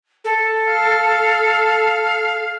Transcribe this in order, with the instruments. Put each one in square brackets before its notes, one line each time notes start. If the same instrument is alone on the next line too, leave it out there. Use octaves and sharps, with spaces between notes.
[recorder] A4
[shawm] F5